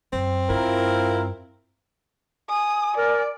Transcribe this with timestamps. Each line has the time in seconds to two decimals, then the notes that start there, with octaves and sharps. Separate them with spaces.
0.13 F#2 C4
0.50 G2 E4 F4 A#4
2.49 G#5 D#6
2.97 A#4 D5